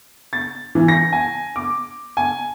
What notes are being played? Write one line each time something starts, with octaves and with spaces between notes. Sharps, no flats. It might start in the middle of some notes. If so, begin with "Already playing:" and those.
A6
E3
A#6
G#5
D6
G#5